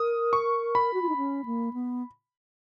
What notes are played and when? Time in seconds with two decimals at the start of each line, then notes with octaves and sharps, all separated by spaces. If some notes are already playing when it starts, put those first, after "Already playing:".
Already playing: A#4 D#6
0.33 C#6
0.75 B5
0.94 F#4
1.02 F4
1.09 D#4
1.17 C#4
1.45 A#3
1.73 B3